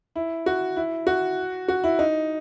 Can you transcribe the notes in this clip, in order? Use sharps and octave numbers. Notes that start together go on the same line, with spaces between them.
E4
F#4
E4
F#4
F#4
E4
D#4